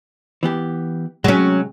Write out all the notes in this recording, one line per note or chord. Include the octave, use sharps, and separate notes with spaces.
E3 B3 G4
C3 F#3 G#3 C#4